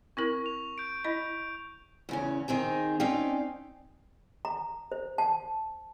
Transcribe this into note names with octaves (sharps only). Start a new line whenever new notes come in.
C4 E4 A#4 C#6
F7
G6 D7
E4 D#5
E2 C#3 C#4
D#3 C4 D#4 G#4
C4 C#4 D#4 D5 F5 G5
A#5
C5
A5